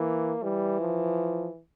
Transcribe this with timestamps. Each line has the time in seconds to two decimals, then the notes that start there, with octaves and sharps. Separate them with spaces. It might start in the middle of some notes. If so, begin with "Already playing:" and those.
Already playing: E3 A#3
0.43 E3 G3
0.81 F3